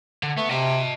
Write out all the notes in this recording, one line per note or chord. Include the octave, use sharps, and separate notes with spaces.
D3
A3 B3
C3 D#5 A5